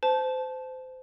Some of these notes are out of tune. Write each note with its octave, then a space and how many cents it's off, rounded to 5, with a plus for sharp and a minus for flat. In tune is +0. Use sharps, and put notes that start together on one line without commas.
C5 -25 A5 -15